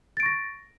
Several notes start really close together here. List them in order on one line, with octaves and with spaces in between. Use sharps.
A6 D7 C#6 A#6